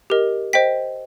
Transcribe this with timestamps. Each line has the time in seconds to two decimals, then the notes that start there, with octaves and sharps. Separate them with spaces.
0.10 G4 A#4 D#5
0.53 C5 D#5 G5 B6